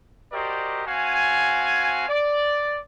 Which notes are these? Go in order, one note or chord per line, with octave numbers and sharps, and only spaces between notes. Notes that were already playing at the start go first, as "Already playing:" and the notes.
F#4 G4 A#4 C5 D5 D#5
C4 F#4 F5 G#5
D5